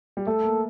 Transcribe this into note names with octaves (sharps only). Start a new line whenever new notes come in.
G3
A3 A4
A#3